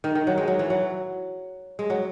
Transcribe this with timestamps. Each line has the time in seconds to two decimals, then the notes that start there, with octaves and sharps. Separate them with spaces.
0.04 D#3
0.15 D#3
0.27 F#3
0.38 G#3
0.48 F#3
0.59 E3
0.70 F#3
1.79 G#3
1.90 F#3